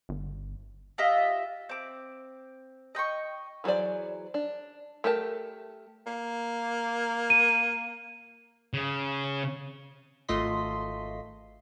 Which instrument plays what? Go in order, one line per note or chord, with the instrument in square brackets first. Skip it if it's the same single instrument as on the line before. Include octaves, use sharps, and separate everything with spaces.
[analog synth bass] G1
[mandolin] F4 G4 D#5 E5
C4 D6
D#5 G5 C6 C#6
[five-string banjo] E3 F#3 G#4 C5 D5
D4
A3 G4 A#4 A5
[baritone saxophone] A#3
[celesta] D#7
[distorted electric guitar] C#3
[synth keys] G#1 A3 F4 D#5 C6 B6